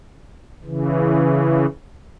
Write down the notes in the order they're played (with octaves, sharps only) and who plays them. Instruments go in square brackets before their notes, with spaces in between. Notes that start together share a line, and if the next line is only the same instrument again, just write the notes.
[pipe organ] C#3 E3